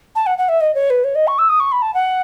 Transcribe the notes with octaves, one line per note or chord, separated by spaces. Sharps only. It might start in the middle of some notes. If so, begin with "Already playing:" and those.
A5
F#5
F#5
E5
D#5
C#5
B4
C#5
D#5
C#6
E6
D#6
C#6
B5
A5
F#5